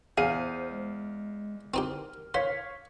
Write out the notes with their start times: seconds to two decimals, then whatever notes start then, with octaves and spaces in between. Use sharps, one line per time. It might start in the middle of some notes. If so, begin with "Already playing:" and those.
0.18 E2 G#4 C5 F5 D#7
0.71 G#3
1.74 C4 D#4 G4 A#4
2.34 C5 C#5 F5 B6